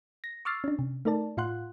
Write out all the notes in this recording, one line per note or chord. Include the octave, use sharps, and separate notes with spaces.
A#6
C#6 D6 E6 F6 A6 C7
C#4 D4
C3
A3 D#4 A#4 D5 A5
A2 F4 F5 F#5 C6 F#6